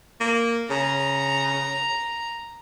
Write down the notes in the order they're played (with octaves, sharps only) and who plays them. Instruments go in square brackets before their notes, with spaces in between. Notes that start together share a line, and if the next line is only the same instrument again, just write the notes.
[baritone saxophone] A#3
[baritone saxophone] C#3 [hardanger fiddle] A#5